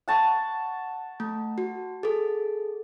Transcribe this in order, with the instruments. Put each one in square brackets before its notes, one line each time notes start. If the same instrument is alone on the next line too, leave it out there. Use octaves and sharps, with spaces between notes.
[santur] F#5 A5 C#6
[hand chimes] A3
F#4
G#4 A4